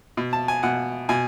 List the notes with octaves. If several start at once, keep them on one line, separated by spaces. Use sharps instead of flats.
B2
A5
G#5
B2 F#5
B2 G#5